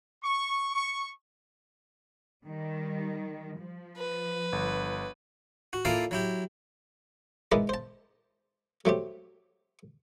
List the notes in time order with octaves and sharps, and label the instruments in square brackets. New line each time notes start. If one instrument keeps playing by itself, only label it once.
[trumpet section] C#6
C#6
[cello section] D#3 G3
F3
[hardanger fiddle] B4
[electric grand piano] G1
[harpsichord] F#4
A#3 E4 F4 A4 D5 F5
F#3 E4 G4
G#3 D#4 E4 A#4 B4 D5
C5 A5
F#3 A3 C4 G4